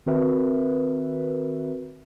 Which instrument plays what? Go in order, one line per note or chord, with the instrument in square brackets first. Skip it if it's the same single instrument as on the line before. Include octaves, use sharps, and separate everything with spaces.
[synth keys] D#3 C4 F#4 A#4 B4 E5